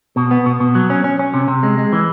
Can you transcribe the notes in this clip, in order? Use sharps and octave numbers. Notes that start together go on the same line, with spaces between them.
B2
B3
B2
B2
F#3
C#4
C#4
C#4
C3
C3
G#3
G#3
E3